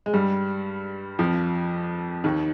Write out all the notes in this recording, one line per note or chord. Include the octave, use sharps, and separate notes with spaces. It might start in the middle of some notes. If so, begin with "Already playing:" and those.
G#3
G2 G3
F2 F3
D#2 D#3